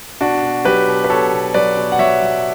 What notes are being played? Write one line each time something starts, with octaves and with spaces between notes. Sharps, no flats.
B2 D4 F#4
B2
F#3 G4 B4
B2
B4
B2 A4 C#5
B2
F#3 B4 D5
B2
F#5
F#3 C#5 E5
F#3